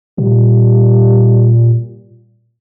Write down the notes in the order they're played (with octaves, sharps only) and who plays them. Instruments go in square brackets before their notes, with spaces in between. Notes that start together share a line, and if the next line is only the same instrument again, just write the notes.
[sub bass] A#2 [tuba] G3